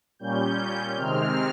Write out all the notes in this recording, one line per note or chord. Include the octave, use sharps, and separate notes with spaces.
A#2 G3 C#4 G6
C3 D#3 G#3 C4 F6